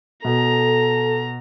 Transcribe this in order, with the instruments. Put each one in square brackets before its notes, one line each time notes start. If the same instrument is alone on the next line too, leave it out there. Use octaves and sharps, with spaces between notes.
[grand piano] B2 [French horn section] A4 [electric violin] A#5